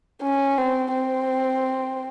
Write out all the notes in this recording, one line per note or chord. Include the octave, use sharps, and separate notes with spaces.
C#4
C4
C4